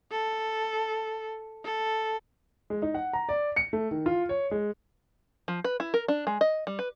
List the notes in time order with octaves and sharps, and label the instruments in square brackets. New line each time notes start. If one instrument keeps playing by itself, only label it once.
[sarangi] A4
A4
[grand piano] G#3
D#4
F#5
A#5
D5
C#7
A3
D#3
F4
C#5
G#3
[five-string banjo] F3
B4
E4
A#4
D4
G#3
D#5
G3
B4